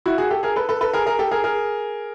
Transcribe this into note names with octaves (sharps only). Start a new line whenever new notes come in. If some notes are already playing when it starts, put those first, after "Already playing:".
E4 F#4
F#4 G#4
G4 A4
G#4 A#4
A4 B4
A4 B4
A4 B4
G#4 A#4
G#4 A#4
G4 A4
G#4 A#4
G#4 A#4